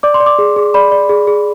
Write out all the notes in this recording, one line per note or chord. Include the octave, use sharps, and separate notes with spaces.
D5 D6
C6
D5
D6
G#4
G#4
D5 B5
D5
G#4
G#4